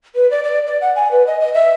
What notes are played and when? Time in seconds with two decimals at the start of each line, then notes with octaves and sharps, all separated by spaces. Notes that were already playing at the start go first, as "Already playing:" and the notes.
0.15 B4
0.31 D5
0.44 D5
0.67 D5
0.81 F#5
0.96 G#5
1.11 B4
1.27 D#5
1.40 D#5
1.54 E5